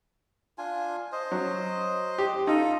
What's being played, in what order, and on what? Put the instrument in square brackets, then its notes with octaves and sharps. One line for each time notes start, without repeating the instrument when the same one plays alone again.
[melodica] D4 F4 G#5
C5 D#5
[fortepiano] F#3
G4
[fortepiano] D#4 [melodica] F4 A4